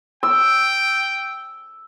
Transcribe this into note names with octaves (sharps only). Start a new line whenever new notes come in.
G5 E6